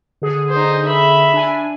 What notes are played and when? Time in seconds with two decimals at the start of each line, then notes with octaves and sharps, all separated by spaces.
0.22 D3 G#4
0.50 D#4 C5
0.85 E5 B5
1.34 D4 G#5